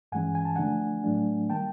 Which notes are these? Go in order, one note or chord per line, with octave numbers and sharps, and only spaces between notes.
G2 E3 G#3 C#4 F#5 G#5
G#5
A5
D3 F3 A3 D4 F#5 G#5
A2 F#3 A3 D4
D#3 G3 A#3 G5 A5